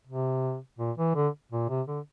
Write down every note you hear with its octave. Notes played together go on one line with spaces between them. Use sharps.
C3
A#2
E3
D3
A#2
C3
D3